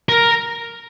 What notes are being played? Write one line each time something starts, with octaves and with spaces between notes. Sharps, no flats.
A#4